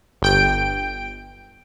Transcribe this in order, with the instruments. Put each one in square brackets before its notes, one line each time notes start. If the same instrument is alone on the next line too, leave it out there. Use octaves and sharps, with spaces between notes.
[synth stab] G1 G5 D7